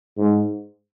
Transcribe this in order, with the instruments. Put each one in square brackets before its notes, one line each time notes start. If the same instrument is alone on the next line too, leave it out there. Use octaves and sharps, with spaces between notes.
[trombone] G#2